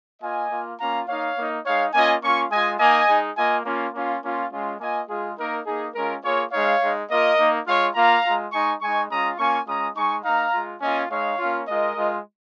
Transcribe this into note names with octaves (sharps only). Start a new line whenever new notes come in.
A#3 F4 D#5 G#5
A#3 F4
A#3 C#4 F4 F5 A#5
A#3 D#4 C#5 F5
A#3 D#4
G#3 D#4 C#5 F5
A#3 C#4 F4 D#5 G#5
A#3 C#4 F4 G#5 C#6
G#3 F4 D#5 G#5
A#3 D#4 D#5 G#5
G#3 D#4
A#3 F4 D#5 G#5
A#3 C#4 F4
A#3 C#4 F4
A#3 C#4 F4
G#3 C#4 F4
A#3 F4 D#5 G#5
G#3 F4 G#4
A#3 D#4 A#4
A#3 D#4 G#4
G#3 C#4 F4 A#4
A#3 F4 G#4 C#5
G#3 D#4 C#5 F5
G#3 D#4
A#3 F4 A#4 D#5
A#3 D#4
G#3 F4 C#5 F5
A#3 F4 F5 A#5
G#3 F4
G#3 D#4 G#5 C#6
G#3 D#4 G#5 C#6
G#3 C#4 F4 A#5 D#6
A#3 C#4 F4 G#5 C#6
G#3 C#4 F4 A#5 D#6
G#3 D#4 G#5 C#6
A#3 D#4 F5 A#5
G#3 F4
A#3 C#4 F4 D#5 G#5
G#3 D#4 C#5 F5
A#3 C#4 F4
G#3 F4 A#4 D#5
G#3 F4